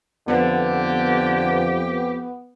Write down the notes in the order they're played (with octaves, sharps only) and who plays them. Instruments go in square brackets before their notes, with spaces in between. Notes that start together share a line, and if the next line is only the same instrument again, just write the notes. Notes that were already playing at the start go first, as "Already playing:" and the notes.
[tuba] F2 [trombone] D3 [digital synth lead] B3 [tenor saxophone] G4